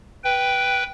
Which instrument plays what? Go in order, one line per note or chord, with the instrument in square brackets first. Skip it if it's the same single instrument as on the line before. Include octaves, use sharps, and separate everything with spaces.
[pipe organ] B4 G5